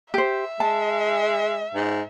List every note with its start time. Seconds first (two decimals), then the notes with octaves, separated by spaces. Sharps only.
0.14 G4 C5 E5
0.60 G#3 A5
1.75 G#2